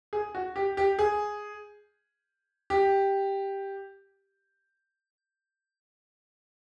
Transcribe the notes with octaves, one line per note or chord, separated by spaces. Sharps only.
G#4
F#4
G4
G4
G#4
G4